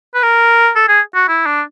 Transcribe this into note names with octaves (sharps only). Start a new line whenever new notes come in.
B4
A#4
A4
G#4
F#4
E4
D4